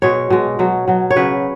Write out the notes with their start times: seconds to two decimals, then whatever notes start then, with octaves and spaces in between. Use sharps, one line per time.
0.02 B2 G#3 C#5
0.30 B2 G#3
0.59 B2 F#3
0.88 B2 F#3
1.11 C#5
1.16 C#3 F#3 B4